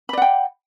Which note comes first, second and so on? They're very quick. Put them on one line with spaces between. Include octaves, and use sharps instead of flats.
B5 D5 F#5 G5